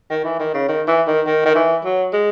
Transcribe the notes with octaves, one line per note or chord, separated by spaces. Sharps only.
D#3
E3
D#3
C#3
D#3
E3
D#3
D#3
D#3
E3
F#3
G#3